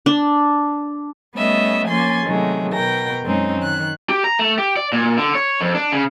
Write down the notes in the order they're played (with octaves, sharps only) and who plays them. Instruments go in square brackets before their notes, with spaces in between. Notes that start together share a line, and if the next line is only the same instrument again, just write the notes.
[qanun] D4
[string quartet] G3 A3 B3 C#4 D#5 E5
F3 A#3 C#4 G#5 C6 A6
C3 D#3 F#3 G#3 A3
B2 A#4 G5 A#6
F#2 G#3 C4 C#4 D#4
D#3 F#6
[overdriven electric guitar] G4
A#5
A3
G4
D5
A#2
D3
C#5
F2
D4
C#3